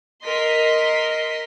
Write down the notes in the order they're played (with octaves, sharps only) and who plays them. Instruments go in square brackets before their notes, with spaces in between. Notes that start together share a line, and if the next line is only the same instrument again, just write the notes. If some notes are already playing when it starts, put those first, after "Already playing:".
[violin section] A#4 D#5 C6 B6